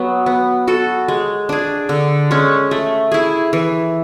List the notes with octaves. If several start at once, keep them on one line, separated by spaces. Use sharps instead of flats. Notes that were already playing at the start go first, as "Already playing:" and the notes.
Already playing: F#3 B3
B3
F#4 A4
G#3
D4 G#4
D3
G#3 C#4
A3
E4 G#4
E3